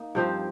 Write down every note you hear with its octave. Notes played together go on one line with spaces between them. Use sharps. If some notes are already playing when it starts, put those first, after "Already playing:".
Already playing: A#3 D#4
G2 F3 C4 G4